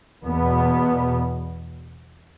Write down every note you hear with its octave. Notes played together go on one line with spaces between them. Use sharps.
E2 B2 B3